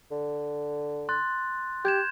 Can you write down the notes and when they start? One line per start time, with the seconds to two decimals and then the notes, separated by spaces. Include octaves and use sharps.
0.12 D3
1.09 C6 F#6 A6
1.85 G4 G6 G#6 E7